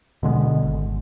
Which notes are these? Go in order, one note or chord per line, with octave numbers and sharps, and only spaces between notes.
B2 D3 G#3 B3
G#1